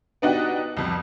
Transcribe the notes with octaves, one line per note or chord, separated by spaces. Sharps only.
B3 D4 D#4 F#4 G4
C2 F2